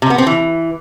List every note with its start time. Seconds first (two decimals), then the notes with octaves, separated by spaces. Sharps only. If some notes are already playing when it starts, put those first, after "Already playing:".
0.02 C3
0.10 B3
0.18 C4
0.27 E3